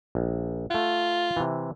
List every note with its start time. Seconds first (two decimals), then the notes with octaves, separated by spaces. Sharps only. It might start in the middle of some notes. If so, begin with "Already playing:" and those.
0.15 A#1
0.70 A3 F4 F#5
1.37 C3 E3